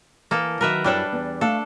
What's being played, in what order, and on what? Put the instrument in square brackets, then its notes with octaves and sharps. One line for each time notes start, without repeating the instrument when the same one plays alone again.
[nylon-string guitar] E3 [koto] A#3 A4
[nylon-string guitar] D#3 F#3 [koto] A#4 B4 E5
[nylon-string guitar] F#2 E4 C#5 [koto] G3 D4 A4
[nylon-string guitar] E2 B3
[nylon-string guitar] A3 F5 [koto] D4 A4